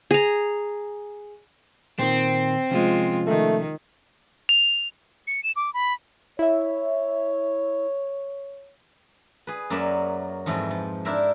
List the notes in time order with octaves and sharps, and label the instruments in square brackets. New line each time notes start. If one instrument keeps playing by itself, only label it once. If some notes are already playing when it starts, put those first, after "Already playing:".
[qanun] G#4 A#5
[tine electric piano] A#2 D#3 [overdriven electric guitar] C4
[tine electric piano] C3 F3 C#4 [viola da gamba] G#3 F4
[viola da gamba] D#3 [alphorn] A3
[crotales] F7
[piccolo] C#7
E7
D6
B5
[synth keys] E4 E5 [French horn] C#5
[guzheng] G#4 B4
F#2 F#3 A#3 B4 D5 E5
F2 G#2 E3 F3
F3
D4 E4 A#4 C5 E5